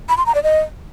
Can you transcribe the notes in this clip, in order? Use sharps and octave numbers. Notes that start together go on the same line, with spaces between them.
B5
C6
A#5
D5
D#5